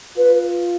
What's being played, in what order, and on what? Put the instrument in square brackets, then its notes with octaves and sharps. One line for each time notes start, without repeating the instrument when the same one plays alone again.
[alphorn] F4 [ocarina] B4